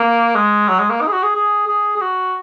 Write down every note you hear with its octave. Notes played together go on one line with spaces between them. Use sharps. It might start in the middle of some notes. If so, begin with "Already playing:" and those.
Already playing: A#3
G#3
F#3
G#3
A#3
D#4
G#4
F#4
G#4
G#4
G#4
G#4
F#4